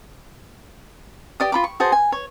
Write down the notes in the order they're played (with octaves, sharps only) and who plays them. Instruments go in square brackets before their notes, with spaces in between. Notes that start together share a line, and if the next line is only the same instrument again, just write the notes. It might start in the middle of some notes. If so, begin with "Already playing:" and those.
[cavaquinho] G4 D5 D#6
F4 B5 D6
C#6
F#4 G#4 C5 A5
G#5
C#5